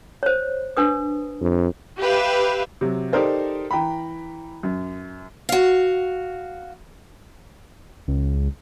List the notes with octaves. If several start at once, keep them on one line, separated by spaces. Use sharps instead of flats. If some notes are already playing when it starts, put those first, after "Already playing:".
C5 C#5
D4 B4 D#6
F2
G4 B4 E5 F5
C3 F#3
D#4 G4 A4 A#4 C5 D5
E3 G5 A#5 B5
F#2
F#4 F5
C#2